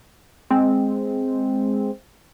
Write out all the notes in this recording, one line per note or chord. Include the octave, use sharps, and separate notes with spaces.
G#3 C4